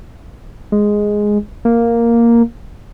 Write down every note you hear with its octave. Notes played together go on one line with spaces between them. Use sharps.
G#3
A#3